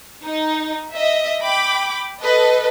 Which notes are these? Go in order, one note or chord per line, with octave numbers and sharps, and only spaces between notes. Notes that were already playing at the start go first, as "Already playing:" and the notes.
D#4
D#5 E5
G5 B5 D6
A4 B4 D#5